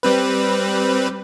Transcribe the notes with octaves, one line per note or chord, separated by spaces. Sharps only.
G3 C4 B4